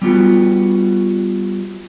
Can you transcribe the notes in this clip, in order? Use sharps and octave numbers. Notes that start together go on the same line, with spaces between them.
G3 B3 F4 F#4